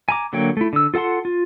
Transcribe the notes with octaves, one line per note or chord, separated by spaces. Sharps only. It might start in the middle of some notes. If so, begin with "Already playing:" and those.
G#5 A#5 D6
D3 F#3 A#3 C#5 G5
A3 E4
D3 E6
F4 A4 F#5 A5 C6
F4